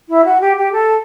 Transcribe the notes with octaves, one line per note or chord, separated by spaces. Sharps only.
E4
F#4
G4
G4
A4